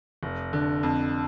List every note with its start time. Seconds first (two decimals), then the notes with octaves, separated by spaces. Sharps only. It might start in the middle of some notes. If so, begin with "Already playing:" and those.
0.23 F1
0.53 D3
0.83 F2